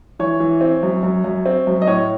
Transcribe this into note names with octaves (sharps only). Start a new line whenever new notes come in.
E3 C#5
E3
C4
F#2
F#2
F#2
C4
F#2
D#5
A2 C#5